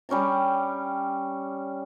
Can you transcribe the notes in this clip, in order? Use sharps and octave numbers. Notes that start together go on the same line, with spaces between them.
G3 C#4 G5 A#5